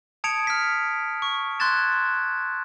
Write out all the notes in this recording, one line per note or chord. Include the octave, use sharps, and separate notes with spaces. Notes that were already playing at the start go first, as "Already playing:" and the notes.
A5 D#6 G#6 C#7 D7 F7
F6 B6
C#6
C6 F#6 G#6 A6 E7